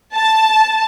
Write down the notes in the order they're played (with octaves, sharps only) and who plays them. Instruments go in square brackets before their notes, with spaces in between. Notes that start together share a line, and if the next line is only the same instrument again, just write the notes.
[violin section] A5